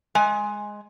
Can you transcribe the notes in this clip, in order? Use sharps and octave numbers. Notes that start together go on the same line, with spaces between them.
G#3 G#5